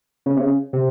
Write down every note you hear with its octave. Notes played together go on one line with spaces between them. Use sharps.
C#3
C3
C#3
C3